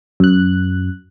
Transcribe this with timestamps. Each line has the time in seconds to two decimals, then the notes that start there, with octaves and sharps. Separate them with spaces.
0.20 F#2 F#6